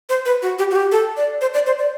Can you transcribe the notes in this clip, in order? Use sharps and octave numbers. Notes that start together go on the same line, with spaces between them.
C5
B4
F#4
G4
F#4
G4
A4
D5
C5
D5
C5
D5